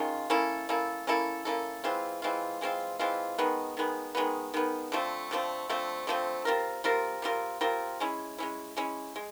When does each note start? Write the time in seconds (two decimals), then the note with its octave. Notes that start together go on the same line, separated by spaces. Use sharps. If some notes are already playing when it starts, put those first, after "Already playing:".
Already playing: D#3 G#3 C#4 F4
0.30 A#3 C#4 E4 A4
0.69 A#3 C#4 E4 A4
1.07 A#3 C#4 E4 A4
1.45 A#3 C#4 E4 A4
1.84 E3 G#3 C4 F4
2.22 E3 G#3 C4 F4
2.61 E3 G#3 C4 F4
2.99 E3 G#3 C4 F4
3.38 D#3 G#3 B3
3.77 D#3 G#3 B3
4.15 D#3 G#3 B3
4.54 D#3 G#3 B3
4.92 D3 F3 A3 C4
5.31 D3 F3 A3 C4
5.69 D3 F3 A3 C4
6.07 D3 F3 A3 C4
6.45 G3 C4 F4 A#4
6.84 G3 C4 F4 A#4
7.22 G3 C4 F4 A#4
7.61 G3 C4 F4 A#4
8.00 G#3 C#4 E4
8.38 G#3 C#4 E4
8.77 G#3 C#4 E4
9.16 G#3